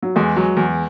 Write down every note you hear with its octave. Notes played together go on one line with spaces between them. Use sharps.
F#3
E2 G#3
F#3
E2